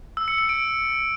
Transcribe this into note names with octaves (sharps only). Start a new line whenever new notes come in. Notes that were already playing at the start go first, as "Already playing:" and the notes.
E6
C#7
C#7
D7